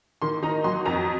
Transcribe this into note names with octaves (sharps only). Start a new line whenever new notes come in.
D#3 C6
D#4 A#5
F#3 C6
F2 A#5